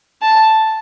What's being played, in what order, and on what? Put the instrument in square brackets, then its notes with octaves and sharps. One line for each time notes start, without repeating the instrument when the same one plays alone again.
[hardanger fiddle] A5